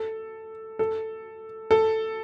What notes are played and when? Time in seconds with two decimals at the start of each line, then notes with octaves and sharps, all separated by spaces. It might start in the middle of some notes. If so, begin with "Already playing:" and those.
Already playing: A4
0.79 A4
1.71 A4